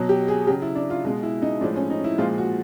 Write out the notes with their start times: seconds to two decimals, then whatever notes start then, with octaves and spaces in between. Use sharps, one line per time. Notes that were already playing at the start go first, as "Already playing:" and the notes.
Already playing: B2 F#3
0.09 G4
0.28 G#4
0.47 C#3 F#3 G4
0.62 E4
0.75 D4
0.90 F4
1.05 B2 G#3 F4
1.23 E4
1.42 D#4
1.61 A2 F3 G#3 D4
1.76 C#4
1.90 D#4
2.04 E4
2.18 A#2 F3 G#3 F4
2.38 F#4